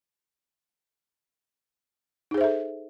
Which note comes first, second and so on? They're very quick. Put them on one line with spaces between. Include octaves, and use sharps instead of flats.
D#4 G#4 C5 E5 A4